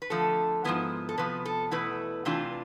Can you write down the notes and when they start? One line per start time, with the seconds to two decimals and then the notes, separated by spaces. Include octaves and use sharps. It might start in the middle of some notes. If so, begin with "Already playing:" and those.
0.02 B4
0.10 F2 D3 F3 A3 A4
0.64 G#2 F3 B3 E4
1.09 A4
1.18 C3 F3 B3 B4
1.45 A4
1.71 E2 B2 A3 E4 B4
2.25 C3 E3 A3 D4 F4